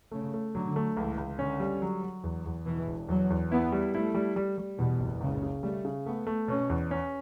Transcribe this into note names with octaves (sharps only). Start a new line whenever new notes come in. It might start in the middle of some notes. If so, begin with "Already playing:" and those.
C#3 A3
A3
D3 F#3
A3
C#2 E3
C#2
D3 C#4
G3
F#3
F#3
E2
E2
B2 E3
E1
E2 F#3
E2
B3 E4
G3
A3 E4
G3
G3
G3
E2 B2
F#1
C#2 C#3
C#3
G3 A3
C#3
A3 B3
A3
B2 C#4
E2
C#4